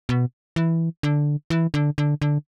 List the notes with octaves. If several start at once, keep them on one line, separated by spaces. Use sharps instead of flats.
B2
E3
D3
E3
D3
D3
D3